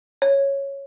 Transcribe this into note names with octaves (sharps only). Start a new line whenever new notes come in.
C#5